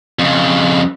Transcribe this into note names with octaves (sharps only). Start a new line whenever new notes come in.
F2 C#3